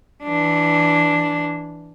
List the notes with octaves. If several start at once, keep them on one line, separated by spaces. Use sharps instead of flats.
E3 D4